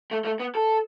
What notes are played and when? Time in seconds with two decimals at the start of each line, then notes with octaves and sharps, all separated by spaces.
0.11 A3
0.25 A3
0.40 B3
0.55 A4